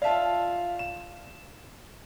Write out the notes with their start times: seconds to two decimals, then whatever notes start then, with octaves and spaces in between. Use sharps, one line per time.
0.02 F4 D5 E5 F5 A5
0.79 E7